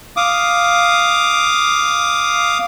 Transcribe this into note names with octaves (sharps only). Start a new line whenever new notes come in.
F5 D6 D#6